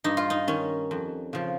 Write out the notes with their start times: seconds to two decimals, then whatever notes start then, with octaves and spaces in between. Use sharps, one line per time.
0.04 G2 D#4
0.17 F4
0.30 D#4
0.48 D#3 C#4
0.91 F2
1.33 C#3 F3